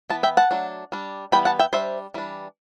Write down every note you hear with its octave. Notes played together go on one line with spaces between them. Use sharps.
E3 B3 A5
E5 G5
F#5 A5
F#3 A3 D4
G3 D4
E3 G3 B3 G5 B5
F#5 A5
E5 G5
G3 D4 C5 E5
E3 G3 D4